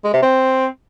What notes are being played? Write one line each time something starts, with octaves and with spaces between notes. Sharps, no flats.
G#3
C3
C4